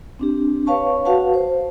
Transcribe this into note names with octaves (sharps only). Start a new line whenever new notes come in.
C4 D4 G4
B4 C#5 F5 A5 C#6
F#4 B4 F5 F#5 A5
C5